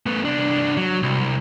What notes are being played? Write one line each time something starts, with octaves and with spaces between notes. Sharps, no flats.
A3 B3
C2 D4
F#3
C2